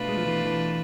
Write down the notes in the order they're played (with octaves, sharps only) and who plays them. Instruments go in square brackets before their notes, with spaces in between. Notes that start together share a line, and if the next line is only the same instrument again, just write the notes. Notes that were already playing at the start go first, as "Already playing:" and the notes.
Already playing: [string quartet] B2 A3 D4 F4 B4
[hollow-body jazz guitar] G#3
F3
E3
E3